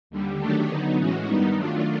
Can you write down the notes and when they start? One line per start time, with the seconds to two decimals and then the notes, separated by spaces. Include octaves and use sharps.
0.10 D#2 D3 G3
0.38 D#3 F#3 A3 D4 G4
0.67 D3 F#3 B3 D#4
0.97 A2 E3 G#3 C#4 F#4
1.26 G2 D#3 G3 B3 D#4
1.54 D#3 F#3 A3 D4 F4